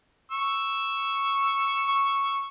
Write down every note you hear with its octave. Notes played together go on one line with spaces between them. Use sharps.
C#6 E6